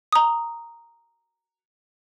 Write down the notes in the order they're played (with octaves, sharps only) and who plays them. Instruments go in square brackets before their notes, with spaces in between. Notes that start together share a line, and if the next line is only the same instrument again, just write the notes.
[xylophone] A#5 D#6